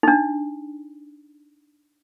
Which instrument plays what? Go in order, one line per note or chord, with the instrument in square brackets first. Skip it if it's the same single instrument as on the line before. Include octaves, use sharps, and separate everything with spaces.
[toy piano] D4 D#4